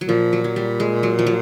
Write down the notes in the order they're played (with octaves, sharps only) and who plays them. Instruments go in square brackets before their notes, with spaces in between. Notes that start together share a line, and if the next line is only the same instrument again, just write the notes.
[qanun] F#3
[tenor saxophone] A#2 [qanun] F3
[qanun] F#3
F#3
G3
G#3
F#3
F3
F#3